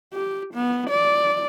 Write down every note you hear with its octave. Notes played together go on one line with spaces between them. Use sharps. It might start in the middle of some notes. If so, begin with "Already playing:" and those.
G4
B3
D5